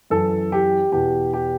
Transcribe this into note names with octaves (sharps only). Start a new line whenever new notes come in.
F#2 E3 A4
G4
E2 B2 G4
G4